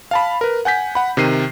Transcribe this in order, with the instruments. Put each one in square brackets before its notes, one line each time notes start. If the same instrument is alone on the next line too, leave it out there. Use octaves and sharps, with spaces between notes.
[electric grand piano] F5 A5 B5
A#4 B4
F#5 G#5 G6 B6
F#5 B5
C3 D#3 C7 D#7